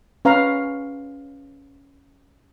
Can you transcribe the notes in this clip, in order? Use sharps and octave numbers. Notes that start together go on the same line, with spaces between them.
C#4 B4 F5 A#5